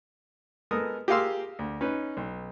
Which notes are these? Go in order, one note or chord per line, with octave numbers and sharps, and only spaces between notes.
G#3 B3 A4 A#4 D#6
G4 G#4 A#4 F5 C6 E6
D2
C#4 D#4 B4
B1